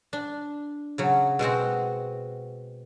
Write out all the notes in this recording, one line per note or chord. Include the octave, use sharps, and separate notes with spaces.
D4
C#3 F#3
B2 G#3 C4 F#4